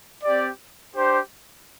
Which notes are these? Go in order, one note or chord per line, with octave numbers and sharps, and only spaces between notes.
C4 G4 D5
D4 G4 C5